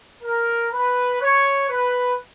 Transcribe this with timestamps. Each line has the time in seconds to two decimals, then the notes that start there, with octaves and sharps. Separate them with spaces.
0.23 A#4
0.72 B4
1.21 C#5
1.69 B4